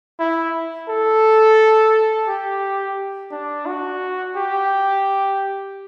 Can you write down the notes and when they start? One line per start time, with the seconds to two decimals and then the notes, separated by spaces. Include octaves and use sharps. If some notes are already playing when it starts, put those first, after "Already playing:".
0.19 E4
0.89 A4
2.27 G4
3.32 D4
3.66 F#4
4.36 G4